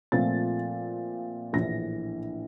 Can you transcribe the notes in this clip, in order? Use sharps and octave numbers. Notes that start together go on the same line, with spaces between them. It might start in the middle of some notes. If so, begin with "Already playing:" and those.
A#2 F3 A3 C4 A6
A#1 A2 E3 A#6